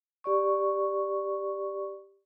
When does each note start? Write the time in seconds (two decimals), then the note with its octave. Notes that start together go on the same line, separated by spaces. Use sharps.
0.24 G4 D5 C#6